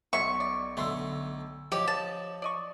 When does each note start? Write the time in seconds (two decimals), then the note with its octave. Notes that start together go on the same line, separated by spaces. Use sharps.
0.13 B1 F#3 E5 C6 C#6
0.40 D5
0.77 B1 D3 A3 B3 C6 E6
1.72 F3 G4 C#5 D#5
1.88 A5
2.42 D5 D#5 C#6